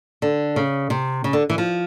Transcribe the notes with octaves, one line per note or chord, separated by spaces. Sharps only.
D3
C#3
C3
C#3
D3
E3
F3